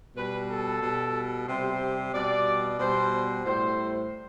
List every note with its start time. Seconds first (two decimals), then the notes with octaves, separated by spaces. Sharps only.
0.16 B2 G3 B4
0.50 A4
0.82 B2 G3
1.48 C3 G3 C5
2.13 B2 G3 D5
2.79 B2 G3 C5
3.45 A2 G3 C5